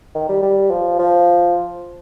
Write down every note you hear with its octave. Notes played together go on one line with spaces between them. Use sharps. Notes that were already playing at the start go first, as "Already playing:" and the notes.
D#3
G3
G3
F3
F3